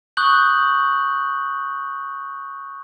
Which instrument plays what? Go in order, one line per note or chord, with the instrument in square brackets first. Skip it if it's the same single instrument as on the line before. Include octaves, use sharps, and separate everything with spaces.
[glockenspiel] C#6 D#6 F#6 G6 F#7